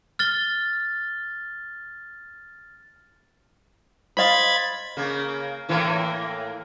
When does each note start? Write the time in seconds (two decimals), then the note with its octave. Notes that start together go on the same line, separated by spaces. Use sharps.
0.19 F6 A6 G7
4.17 C5 D#5 F5 B5 G#6 A6
4.97 C#3 A#3
5.69 A2 E3 A#3